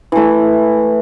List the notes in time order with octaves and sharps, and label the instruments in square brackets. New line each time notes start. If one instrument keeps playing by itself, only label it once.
[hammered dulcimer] E3 A3 E4